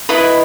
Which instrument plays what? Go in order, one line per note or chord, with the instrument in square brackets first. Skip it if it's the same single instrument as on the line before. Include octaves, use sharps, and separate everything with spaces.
[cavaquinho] E4 B4 D#5